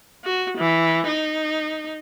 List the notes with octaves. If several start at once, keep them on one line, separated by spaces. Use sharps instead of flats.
F#4
E3
D#4